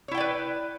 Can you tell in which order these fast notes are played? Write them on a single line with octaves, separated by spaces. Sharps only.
C#5 E4 G5 D5 B4